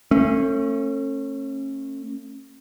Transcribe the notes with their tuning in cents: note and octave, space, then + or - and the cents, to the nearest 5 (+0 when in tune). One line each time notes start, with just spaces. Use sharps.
A3 +30 C#4 -30